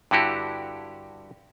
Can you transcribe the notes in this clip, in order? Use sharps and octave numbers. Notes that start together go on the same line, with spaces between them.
G2 D3 E4 F#4 G4